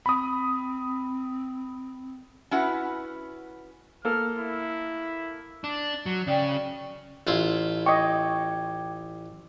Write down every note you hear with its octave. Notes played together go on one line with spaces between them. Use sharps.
C4 B5 D#6
C#4 E4 F#4 B4 F#5
A#3 A4 F6
E4
D4
F#3
C#3 D5 G5
A1 E4 F4
D#5 G5 C#6 D6 G#6